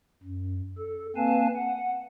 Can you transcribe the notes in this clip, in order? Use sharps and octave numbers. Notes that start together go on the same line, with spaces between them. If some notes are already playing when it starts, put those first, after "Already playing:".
F#2
A4
A#3 C4 B4 F5 G#5 A5
F#5